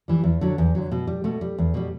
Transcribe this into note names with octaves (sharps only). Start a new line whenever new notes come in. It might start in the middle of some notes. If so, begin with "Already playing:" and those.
E3 G3
E2
D3 F#3
E2
D3 F#3
B2
G3
B2 A3
G3
E2
B2 G3